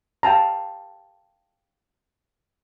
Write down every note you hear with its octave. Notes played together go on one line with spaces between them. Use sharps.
F5 G5 A5 A#5